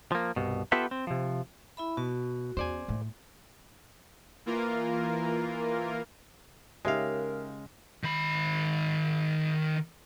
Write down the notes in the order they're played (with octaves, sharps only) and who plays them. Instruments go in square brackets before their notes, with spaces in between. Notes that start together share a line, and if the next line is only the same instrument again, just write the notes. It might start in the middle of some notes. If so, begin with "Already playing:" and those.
[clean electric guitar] F3 A#3
C2 G2 B2
B3 F4 G4 A4 B4 E5
C4
C3 F3
[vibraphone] E4 E5 B5
[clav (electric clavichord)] B2 [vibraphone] F#4
[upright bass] E2 C#4 [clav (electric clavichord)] C5 D5 G#5
[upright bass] A2 A3
[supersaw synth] E3 A#3 F4 A#4
[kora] C#3 [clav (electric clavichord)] G#3 F5 [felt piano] D#4 G4 E5 [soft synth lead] A#4
[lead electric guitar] D#3 B5